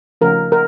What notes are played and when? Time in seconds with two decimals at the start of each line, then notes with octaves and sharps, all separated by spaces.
0.21 C#3 F3 A3 C#4 A#4
0.52 A#4